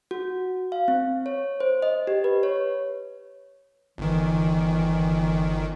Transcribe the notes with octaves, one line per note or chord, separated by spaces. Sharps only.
F#4
F5
C4
C#5
C5
D#5
G4
B4
C#5
G1 D#3 E3